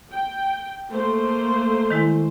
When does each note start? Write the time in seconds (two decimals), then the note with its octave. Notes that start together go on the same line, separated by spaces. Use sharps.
0.11 G5
0.89 A3 A#3 C5
1.90 D#3 G#3 E4